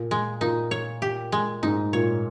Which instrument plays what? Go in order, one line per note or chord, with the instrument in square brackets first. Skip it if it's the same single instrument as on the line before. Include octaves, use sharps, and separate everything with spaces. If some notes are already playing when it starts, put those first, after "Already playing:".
Already playing: [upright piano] A#2
[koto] G#3
[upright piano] A#2 [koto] D#4
[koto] C#5
G4
G#3
[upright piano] G#2 [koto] D#4
[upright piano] A#2 [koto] C#5